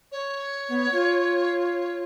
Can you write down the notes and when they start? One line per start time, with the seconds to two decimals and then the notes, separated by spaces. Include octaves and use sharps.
0.12 C#5
0.69 B3
0.92 F4